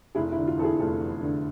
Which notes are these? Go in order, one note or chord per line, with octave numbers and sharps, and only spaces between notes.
F1 E4 G#4
E4
D3
F4
E2 A4
E4 G#4
F1 F4 A4
E2
D3